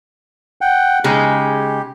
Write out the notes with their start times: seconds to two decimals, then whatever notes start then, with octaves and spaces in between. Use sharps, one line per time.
0.61 F#5 G5
1.04 C#3 G#3 D#4 G4